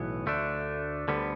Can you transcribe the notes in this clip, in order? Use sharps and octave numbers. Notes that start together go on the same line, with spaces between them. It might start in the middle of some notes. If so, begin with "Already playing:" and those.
Already playing: B1 A2 E3 B3
D2 D3 A3 D4
D2 D3 G3 B3